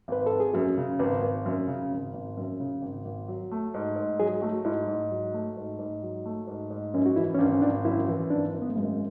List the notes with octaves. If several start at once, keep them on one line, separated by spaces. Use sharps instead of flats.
G#1 B4
A4
G#1
G#4
F#2 F#4
C#3
G#1 B4
G#1
F#2
C#3
G#1
G#1
F#2
C#3
G#1
G#1
F#3
A3
G#2
G#2
F#3 G#4
A3 F#4
G#2 E4
G#2
F#3
A3
G#2
G#2
F#3
A3
G#2
G#2
F#2 C#4
F#4
E3 E4
C#4
G#1 D4
C#4
G#1 D4
F#2 E4
E3
G#1 D4
G#1
B3
A3
F#2 G#3